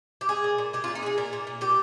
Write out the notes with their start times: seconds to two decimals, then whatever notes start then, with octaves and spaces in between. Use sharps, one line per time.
0.21 G4
0.29 G#3 G#4
0.44 A#2
0.58 A#2
0.73 G#3 G4
0.84 F4
0.88 A#2
0.95 D#4
1.03 G#3 G#4
1.18 A#2 A#4
1.33 A#2
1.47 A#2
1.61 A#2 G4